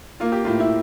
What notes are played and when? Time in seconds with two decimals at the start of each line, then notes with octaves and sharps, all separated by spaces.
0.20 A#3 F4
0.32 G4
0.44 A2 F4
0.60 E4